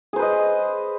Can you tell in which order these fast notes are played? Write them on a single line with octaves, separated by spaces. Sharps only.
G#4 C5 B4 D#5